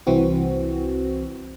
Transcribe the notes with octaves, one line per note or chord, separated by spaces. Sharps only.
C2 E3 C4 F#4